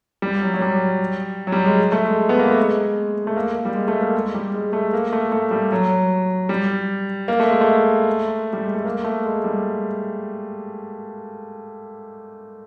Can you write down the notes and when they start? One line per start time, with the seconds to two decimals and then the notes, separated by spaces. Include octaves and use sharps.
0.22 G3
0.42 F#3
0.54 F#3
0.61 G3
1.47 F#3
1.52 G3
1.66 G#3
1.92 A3
2.05 G#3
2.29 B3
2.39 A#3
2.48 A3
2.58 G#3
3.27 A3
3.36 A#3
3.56 A#3
3.65 G3
3.75 G#3
3.88 A3
4.01 A#3
4.15 G#3
4.34 G3
4.54 G#3
4.73 A3
4.93 A#3
5.13 A3
5.32 A3
5.51 G3
5.72 F#3
6.49 G3
7.28 A#3
7.40 A3
7.50 G#3
7.61 A3
8.53 G3
8.64 G#3
8.74 A3
8.85 A#3
9.04 A3
9.25 G#3
9.44 G3